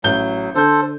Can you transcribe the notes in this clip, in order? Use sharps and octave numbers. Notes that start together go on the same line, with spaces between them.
A1 F#3 G6 G7
D3 A4 C5 G6